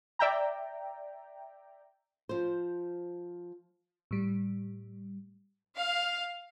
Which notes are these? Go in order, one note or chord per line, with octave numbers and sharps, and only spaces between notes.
D5 E5 G5 A#5
F3 C5
A2 G3
F5